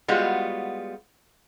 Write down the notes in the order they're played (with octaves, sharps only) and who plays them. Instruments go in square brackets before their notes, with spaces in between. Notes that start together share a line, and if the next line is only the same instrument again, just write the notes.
[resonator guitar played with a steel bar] G3 G#3 B3 F4 F#4